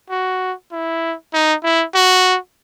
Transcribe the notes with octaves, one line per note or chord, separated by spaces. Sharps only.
F#4
E4
D#4
E4
F#4